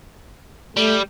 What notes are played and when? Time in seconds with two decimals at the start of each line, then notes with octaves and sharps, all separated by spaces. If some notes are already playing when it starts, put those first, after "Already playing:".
0.77 G3 A3